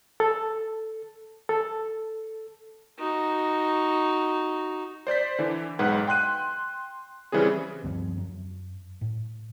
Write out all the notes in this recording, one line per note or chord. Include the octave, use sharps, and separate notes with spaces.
A4
A4
D#4 F#4
C5 D5 G6 B6
D3 E3
B1 G#2 B4 F#5
G5 C6 F#6 D#7
C#3 E3 G3 C4 G#4
D2 G2 F3 C4
F#2
A2